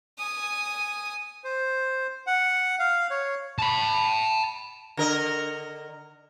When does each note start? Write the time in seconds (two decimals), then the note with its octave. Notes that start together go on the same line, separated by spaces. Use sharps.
0.18 G#5 D#6
1.44 C5
2.27 F#5
2.79 F5
3.11 C#5
3.58 A5 B5
4.97 D3 A#4 D#5